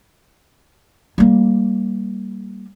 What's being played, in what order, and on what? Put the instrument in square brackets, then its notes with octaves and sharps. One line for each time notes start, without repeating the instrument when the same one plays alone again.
[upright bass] G3 A#3